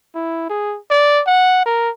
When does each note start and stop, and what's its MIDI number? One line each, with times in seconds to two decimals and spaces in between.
0.15 0.45 64
0.50 0.77 68
0.90 1.22 74
1.27 1.64 78
1.66 1.90 70